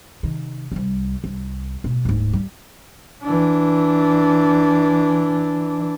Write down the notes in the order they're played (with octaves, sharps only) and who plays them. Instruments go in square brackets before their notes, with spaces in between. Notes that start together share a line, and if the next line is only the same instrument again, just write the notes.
[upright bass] C3 D#3
C2 G3
C2
D1 B2
D1 G#2
G3
[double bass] E3 D4